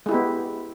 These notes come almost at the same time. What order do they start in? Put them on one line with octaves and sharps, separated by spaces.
G#3 E4 G4 B3